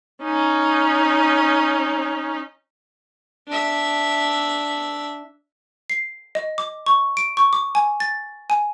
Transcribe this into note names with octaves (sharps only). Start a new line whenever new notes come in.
C#4 D#4
D4 E5
C7
D#5
D6
C#6
D7
C#6
D6
G#5
A6
G#5